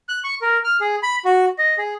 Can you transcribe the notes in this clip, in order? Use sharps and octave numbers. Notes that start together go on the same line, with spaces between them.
F#6
C#6
A#4
F6
G#4
B5
F#4
D#5
G#4